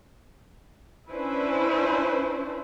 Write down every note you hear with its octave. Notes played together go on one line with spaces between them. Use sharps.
C#4 D4 E4 B4 C5